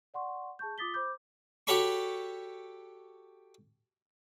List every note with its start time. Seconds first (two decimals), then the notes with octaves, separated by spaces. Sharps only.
0.14 D5 F#5 C6 C#6
0.59 G#4 A5 C#6 G6
0.78 F4 D6 D#6 A6 B6 G7
0.94 C5 B5 D6 G6
1.67 F#4 G4 A4 C#5 B5 C#6